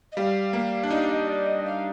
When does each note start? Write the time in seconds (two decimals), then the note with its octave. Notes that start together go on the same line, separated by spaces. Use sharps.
0.12 D#5
0.16 G3 F5
0.53 A#3
0.83 D4
0.91 D#4 F5
1.09 D#5
1.28 D5
1.46 D#5
1.65 F5